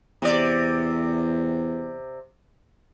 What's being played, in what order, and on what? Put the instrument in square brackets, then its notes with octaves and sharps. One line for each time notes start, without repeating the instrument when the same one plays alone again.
[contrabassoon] E2 [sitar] C3 D5